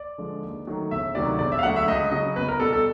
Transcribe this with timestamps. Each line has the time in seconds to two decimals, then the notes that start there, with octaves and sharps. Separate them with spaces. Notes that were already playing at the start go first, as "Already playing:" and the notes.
Already playing: D5
0.18 D3 F3 G#3
0.43 D#2
0.67 D#3 F#3 A3
0.91 E1 E5
1.15 D2 C3 D#3 F#3 D5
1.39 E1 D5
1.52 E5
1.59 F5
1.63 D2 D3 F#3 F#5
1.76 E5
1.88 C#2 D#5
2.11 C#3 F#3 D#5
2.36 E2 B4
2.48 A#4
2.60 B2 G3 A4
2.73 A4